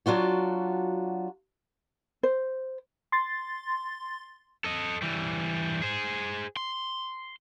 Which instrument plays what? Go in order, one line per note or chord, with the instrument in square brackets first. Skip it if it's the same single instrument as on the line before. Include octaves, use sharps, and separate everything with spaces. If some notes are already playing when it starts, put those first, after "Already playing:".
[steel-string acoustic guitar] F#3 D4 F4 F#4
[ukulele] C5
[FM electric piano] C6 A6
[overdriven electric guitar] A4 D#5
E3 G3
G#4 C5
C6